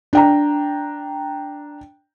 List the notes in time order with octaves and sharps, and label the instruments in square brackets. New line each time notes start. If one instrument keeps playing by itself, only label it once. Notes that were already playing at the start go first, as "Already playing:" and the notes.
[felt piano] D4 G5 A#5